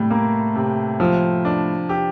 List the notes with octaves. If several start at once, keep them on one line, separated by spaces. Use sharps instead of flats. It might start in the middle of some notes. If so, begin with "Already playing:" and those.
Already playing: A2 C3 G3
A#3
C3
F3
D4
G4